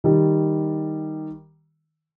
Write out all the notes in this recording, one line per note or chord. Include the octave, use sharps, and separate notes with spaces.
D#3 G3